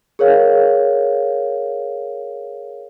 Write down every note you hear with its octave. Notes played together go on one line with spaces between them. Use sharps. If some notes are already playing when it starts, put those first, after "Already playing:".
G#4 A#4 C#5 F5